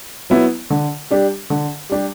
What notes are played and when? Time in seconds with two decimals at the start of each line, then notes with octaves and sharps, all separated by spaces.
0.30 F#3 B3 E4
0.70 D3
1.11 G3 D4 G4
1.50 D3
1.89 G3 D4 G4